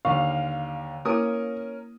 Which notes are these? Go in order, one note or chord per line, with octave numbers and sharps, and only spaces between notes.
D#2 D3 F5 C#6
A#3 C#4 E4 A#4 D#6